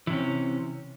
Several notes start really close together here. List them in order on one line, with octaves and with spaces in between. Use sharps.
E3 C3 C#4